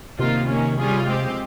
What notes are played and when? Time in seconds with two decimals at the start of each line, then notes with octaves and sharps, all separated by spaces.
0.19 C3 D#3 A#3 F4
0.49 D#3 A#3 C#4
0.79 G3 C#4 F4 G#4
1.08 G#3 C4 G4